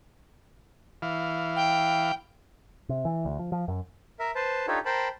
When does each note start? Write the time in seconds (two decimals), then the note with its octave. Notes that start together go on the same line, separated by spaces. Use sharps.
1.02 E3 F5
1.56 G5
2.89 C3
3.05 E3
3.25 D2
3.39 F3
3.52 F3
3.68 F#2
4.19 A#4 E5
4.35 B4 C5 A5
4.67 D4 D#4 F4 G4 A4 C#5
4.86 A#4 C5 G5 A5 B5